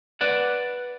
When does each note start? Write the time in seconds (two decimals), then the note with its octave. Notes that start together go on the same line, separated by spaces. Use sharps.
0.21 B4 D5 F#5